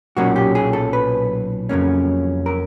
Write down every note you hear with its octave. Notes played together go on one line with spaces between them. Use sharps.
B1 A#2 F#3 A#3 C#4 F#4
G4
G#4
A4
B4
F2 C#3 F#3 A#3 C#4
A#4